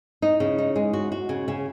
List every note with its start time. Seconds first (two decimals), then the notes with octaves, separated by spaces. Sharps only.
0.22 D#4
0.40 C#3
0.59 D#4
0.76 G#3
0.93 F#4
1.12 F#4
1.29 C#3
1.48 C#3